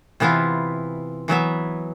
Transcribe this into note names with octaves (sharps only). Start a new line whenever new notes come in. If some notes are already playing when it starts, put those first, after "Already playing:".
C3 E3 B3 E4 F4
E3 F#3 B3 E5